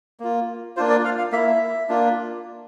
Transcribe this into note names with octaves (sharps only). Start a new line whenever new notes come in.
A#3 F4
A#3 D4 F4 C5
D5
F5
F5
A#3 E4 E5
A#3 D4 F4